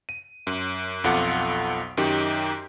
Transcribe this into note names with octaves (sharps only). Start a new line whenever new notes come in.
D#7
F#2
B1 F2 F4 A4 F#5 D6
F#2 D#3 D#4 G4